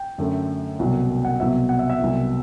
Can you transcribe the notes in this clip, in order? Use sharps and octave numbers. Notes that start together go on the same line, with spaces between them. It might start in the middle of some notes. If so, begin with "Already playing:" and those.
Already playing: G5
F#2 D3 A3
C2 B2 F#3 A3
F#5
C2 B2 F#3 B3 E5
F#5
E5
E5
C2 B2 F#3